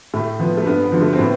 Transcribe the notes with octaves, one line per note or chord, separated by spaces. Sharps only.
A2 A3
F3 B3
A3
G2 B3
B3
D3 F3
A3
C4
A2 B3